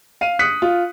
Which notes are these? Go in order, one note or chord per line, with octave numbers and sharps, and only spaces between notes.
F5 D#7
D#6 F#6 B6 C#7
F4